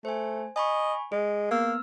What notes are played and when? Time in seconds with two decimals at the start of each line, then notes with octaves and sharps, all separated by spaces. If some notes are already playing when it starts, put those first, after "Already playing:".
0.05 A3 C5 G#5
0.56 D#5 G#5 B5 C#6
1.12 G#3 G#4
1.51 A#3 B3 E6 F6